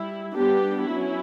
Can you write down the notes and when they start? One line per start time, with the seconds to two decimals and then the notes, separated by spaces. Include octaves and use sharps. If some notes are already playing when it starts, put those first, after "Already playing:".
Already playing: G3 E4
0.35 G3 B3 D4 G4
0.88 F#3 C#4 E4